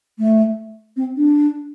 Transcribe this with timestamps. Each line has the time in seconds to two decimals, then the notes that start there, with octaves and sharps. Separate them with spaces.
0.19 A3
0.97 C4
1.17 D4